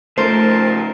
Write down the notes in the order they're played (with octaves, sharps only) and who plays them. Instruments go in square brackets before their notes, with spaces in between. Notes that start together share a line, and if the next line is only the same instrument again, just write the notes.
[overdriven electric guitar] C#3 F3 [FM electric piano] A3 [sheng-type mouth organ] A#4 A5 [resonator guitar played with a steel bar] C5